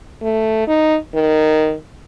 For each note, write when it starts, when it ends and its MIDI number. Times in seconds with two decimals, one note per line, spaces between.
0.22 0.65 57
0.67 0.97 63
1.15 1.75 51